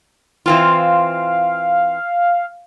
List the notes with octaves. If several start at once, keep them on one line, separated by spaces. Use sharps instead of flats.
E3 C4 F4 F5